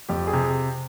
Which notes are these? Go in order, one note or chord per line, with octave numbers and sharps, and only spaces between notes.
F2 G4
G#4
C3